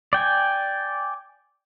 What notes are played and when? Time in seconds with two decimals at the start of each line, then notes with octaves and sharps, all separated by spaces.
0.13 D5 G5 G#5